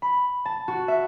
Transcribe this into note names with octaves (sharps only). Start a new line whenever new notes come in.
B5
A5
F#4
E5